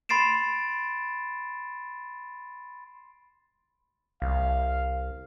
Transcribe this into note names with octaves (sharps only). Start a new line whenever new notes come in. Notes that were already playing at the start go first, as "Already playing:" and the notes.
B5 C6 A6 C7 D7 E7
C2 F5